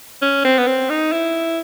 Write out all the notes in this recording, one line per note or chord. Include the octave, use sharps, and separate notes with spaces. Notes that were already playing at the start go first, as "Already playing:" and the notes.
C#4
C4
B3
C4
D#4
E4